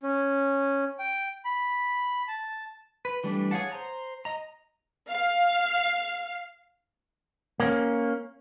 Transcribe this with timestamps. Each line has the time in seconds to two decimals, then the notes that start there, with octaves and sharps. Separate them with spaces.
0.03 C#4
0.99 G5
1.45 B5
2.28 A5
3.05 B4
3.24 E3 G3 A3 D4
3.51 G#4 C#5 F5 F#5 A5
3.72 C5 A#5
4.25 D#5 A#5
5.10 F5
7.60 A#3 C#4